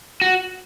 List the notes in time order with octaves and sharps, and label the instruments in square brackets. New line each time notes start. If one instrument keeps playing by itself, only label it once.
[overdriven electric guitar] F#4